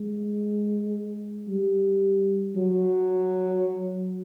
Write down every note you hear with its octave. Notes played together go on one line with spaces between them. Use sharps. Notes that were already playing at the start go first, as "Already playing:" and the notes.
Already playing: G#3
G3
F#3